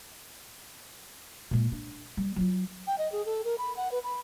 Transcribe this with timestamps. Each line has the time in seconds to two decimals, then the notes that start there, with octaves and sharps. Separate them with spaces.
1.51 A#2 G#3
1.72 D4
2.17 G3
2.36 F#3 F4
2.87 G5
2.98 D#5
3.12 G#4
3.26 A4
3.44 A#4
3.58 B5
3.77 F#5
3.92 B4
4.04 B5